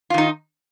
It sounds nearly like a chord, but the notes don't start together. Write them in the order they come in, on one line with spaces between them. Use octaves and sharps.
F4 D#3 D#4